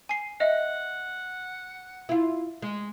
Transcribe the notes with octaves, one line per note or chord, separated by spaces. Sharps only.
G#5 C7
D#5 E5 F#5
E4 F4
G#3